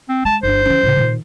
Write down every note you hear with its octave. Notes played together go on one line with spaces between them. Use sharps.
C4
G#3 A5
G1 D4 C5
E3 C#4
A2 C#3
A#2 D#3